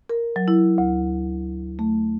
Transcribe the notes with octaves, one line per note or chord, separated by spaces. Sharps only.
A#4
F#3
E4
D2
A3